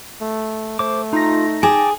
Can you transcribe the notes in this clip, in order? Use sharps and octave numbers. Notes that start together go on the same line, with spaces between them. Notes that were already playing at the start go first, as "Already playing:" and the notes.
A3
A3 C5 D6
D#4 F4 A#6
G#4 G5 A5 D6